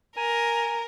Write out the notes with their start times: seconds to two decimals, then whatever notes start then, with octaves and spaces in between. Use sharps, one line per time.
0.17 A#4 G#5 A#5